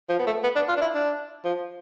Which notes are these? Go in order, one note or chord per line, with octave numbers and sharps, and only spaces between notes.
F3
B3
A3
B3
D4
F4
D4
E4
D4
F3